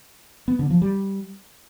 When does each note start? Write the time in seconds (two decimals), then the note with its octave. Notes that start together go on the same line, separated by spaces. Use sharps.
0.48 B3
0.59 D3
0.70 F3
0.82 G3